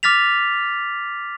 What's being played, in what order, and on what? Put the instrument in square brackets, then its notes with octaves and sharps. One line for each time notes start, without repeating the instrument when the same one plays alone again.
[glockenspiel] D6 F6 A6 B6 F7